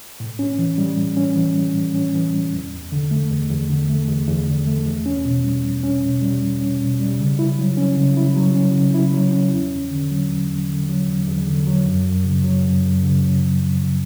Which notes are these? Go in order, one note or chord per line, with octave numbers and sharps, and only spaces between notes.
A2
C#4
E3
G3
A2
C#4
E3
G3
A2
C#4
E3
G3
E2
E2
D3
A3
E2
E2
D3
A3
E2
E2
D3
A3
E2
C#4
B2
G3
E2
C#4
B2
G3
E2
C#4
B2
G3
C#3
E4
F#3
C#4
C#3
E4
F#3
C#4
C#3
E4
F#3
C#4
E2
E2
D3
F#3
E2
E2
D3
F#3
E2
E2
D3
F#3
F#2
F#2
C#3
F#3
F#2
F#2
C#3
F#3
F#2
F#2
C#3